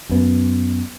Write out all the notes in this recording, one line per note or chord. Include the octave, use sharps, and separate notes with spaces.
F#2 B3